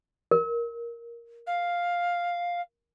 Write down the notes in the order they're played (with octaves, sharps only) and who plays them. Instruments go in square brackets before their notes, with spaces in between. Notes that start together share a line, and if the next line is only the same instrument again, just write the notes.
[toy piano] A#4
[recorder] F5